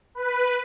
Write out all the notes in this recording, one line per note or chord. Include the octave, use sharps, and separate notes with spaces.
B4